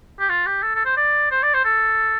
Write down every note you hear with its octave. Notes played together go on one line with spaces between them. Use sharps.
G4
F4
G4
A4
A4
C5
D5
C5
D5
C5
A4